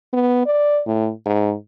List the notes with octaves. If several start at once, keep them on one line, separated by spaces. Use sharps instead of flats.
B3
D5
A2
G#2